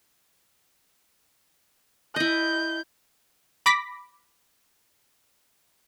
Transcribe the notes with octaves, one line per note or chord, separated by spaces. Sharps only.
E4 D#5 G6
B5 D6 A#6 B6